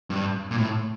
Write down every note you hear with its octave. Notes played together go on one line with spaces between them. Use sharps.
G2
A#2
A2